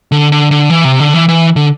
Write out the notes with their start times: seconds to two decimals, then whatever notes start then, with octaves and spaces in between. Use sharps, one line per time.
0.12 D3
0.32 D3
0.51 D3
0.70 E3
0.84 C3
1.00 D3
1.14 E3
1.29 E3
1.56 D3